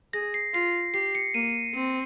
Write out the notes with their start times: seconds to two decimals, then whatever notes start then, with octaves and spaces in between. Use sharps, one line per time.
0.13 G#4 A#6
0.34 C7
0.54 F4 C7
0.94 G4 C7
1.15 C#7
1.34 A#3 D#7
1.75 C4